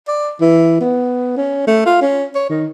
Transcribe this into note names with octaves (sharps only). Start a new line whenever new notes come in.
D5
E3
B3
C#4
A3
F4
C#4
C#5
D#3